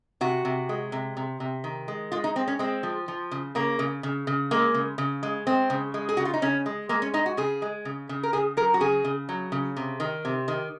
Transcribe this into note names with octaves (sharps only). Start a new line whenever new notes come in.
C3 F#4
C3
G#3
C3
C3
C3
D#3
G#3
G#3 F4
D#4
G#3 C4
C#4
G#3 C4
F3
F3
C#3
C#3 A#3
C#3
C#3
C#3
G#3 A#3
C#3
C#3
G#3
G#3 C4
C#3
G#3
G#4
C#3 F#4
F4
D#4
C#3 C#4
G#3
G#3 A#3
C#4
G#3 D#4
F#4
C#3 G#4
G#3
C#3
C#3
A#4
C#3 G#4
F#3 A#4
F#4
C#3 G#4
C#3
F#3
C#3
C3
D#3
C3
D#3